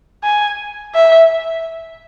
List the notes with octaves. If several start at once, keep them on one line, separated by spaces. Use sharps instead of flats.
G#5
E5